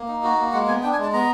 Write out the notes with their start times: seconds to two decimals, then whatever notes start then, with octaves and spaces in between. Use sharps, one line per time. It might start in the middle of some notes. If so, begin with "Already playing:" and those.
Already playing: A#3
0.08 D#4
0.23 F#4
0.38 A#3
0.53 G#3 F#5
0.68 B3 G#5
0.83 D4 G5
0.93 G#5
0.97 G#3
1.03 A5
1.13 B3 A#5